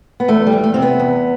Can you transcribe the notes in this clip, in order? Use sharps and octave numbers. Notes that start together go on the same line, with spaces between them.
B3
E2 A3
G3
E2
A3
C3 C4
B3
E2